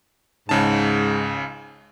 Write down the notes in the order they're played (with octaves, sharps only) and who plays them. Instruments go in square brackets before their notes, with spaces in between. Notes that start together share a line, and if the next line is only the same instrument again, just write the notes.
[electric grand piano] C#2 C#3 A5 [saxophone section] G#2